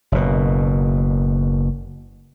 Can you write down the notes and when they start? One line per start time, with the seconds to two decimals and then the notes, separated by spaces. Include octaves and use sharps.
0.12 F#1 B2